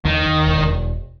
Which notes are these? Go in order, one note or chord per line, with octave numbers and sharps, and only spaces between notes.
D#2 D#3
D#2
E1